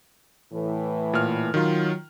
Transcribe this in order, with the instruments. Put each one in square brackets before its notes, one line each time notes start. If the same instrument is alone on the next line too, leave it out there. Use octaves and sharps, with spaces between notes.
[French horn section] A2 E3
[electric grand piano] A#2 F6
[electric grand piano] D#3 F4 [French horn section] F#3